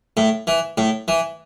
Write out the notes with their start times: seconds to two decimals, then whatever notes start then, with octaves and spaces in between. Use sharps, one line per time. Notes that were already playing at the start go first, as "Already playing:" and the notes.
0.17 A2
0.47 E3
0.78 A2
1.08 E3